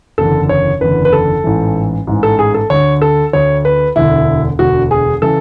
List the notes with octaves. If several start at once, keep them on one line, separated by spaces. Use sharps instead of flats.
F#1 E2 D3 A4
C#5
F#1 E2 D3 B4
B4
A4
A1 G#2 E3
A1 G#2 E3
A4
G#4
A4
D2 D3 C#5
A4
D2 D3 C#5
B4
E1 D2 D3 E4
E1 D2 D3 F#4
G#4
C#3 E3 A4